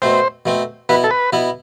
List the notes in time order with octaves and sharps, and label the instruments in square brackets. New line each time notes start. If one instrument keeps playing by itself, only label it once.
[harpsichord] B2 A3 C4 [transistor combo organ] C5
[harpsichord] B2 A3 C4
[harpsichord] B2 B3 E4 [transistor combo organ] B4
[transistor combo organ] A4
B4
[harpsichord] B2 B3 E4